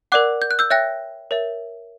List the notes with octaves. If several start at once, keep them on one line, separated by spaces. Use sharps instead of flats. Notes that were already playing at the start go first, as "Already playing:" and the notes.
A#4 D5 F#5 D6 F#6
G6
F#6
E6 G6
C#5 E5 G5 F#6 A#6
A#4 C#5 E5